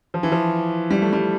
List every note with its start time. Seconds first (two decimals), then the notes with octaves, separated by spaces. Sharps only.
0.14 F3
0.23 E3
0.32 F3
0.91 G3
1.02 A3
1.13 G3